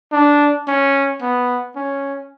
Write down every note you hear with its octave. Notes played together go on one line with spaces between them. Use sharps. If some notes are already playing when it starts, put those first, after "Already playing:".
D4
C#4
B3
C#4